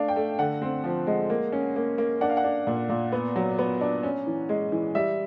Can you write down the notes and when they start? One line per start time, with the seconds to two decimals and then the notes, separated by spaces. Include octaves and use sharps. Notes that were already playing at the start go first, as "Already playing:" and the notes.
Already playing: A3 D4 F5
0.08 G5
0.16 A3
0.39 D3 F#5
0.62 C4
0.84 F3
1.07 G#3
1.30 A#3
1.52 C#4
1.76 A#3
1.98 A#3
2.21 D4 F#5
2.30 F5
2.37 F#5
2.44 D4
2.67 A#2
2.89 A#2
3.12 B3
3.36 F#3
3.58 B3
3.81 D4
4.03 C#4
4.27 E3
4.49 G#3
4.72 E3
4.95 G3 E5